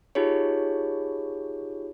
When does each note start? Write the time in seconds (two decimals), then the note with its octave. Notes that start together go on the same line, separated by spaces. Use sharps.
0.15 D#4 F4 G4 G#4 C#5